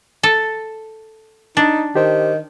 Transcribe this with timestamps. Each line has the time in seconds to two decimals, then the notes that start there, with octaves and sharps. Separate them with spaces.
0.23 A4
1.57 D4 D#4
1.95 D#3 G4 C5